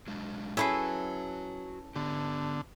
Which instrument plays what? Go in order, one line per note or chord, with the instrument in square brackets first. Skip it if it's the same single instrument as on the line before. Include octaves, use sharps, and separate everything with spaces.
[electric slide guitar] F#3 G#3 D4
[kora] C#4 E4 B4 [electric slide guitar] F#4 C#5 [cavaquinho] G#4 A4 E5
[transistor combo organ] D3 [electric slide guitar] B3 G4